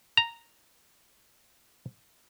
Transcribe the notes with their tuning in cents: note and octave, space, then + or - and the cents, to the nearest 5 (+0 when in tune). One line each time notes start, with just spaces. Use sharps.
A#5 -5